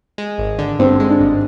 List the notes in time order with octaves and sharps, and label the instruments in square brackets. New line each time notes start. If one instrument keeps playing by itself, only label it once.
[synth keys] G#3
G#1
D3
[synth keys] G2 [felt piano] C4
[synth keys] G#3
[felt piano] D4
[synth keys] G#1